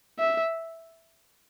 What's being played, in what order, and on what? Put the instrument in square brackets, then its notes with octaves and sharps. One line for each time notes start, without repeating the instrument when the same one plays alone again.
[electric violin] E5